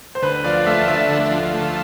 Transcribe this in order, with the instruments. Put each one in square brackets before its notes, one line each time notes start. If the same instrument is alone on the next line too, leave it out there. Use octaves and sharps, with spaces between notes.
[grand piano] C5
[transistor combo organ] D2 [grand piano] B4
[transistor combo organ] F3 [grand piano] D5
[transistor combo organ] A3 [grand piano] E5
[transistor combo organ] D3 [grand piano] E5
[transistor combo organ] D2
F3
A3